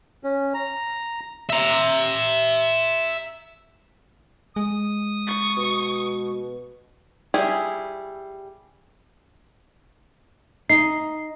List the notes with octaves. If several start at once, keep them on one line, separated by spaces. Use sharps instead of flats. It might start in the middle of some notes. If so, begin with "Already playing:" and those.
C#4
A#5
E5 A#5
G#3 D#6
C#6
B2
G3 E4 G#4
D#4 C7